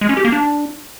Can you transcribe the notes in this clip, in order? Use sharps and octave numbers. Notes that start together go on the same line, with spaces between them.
G#3
C#4
G4
A#3
D4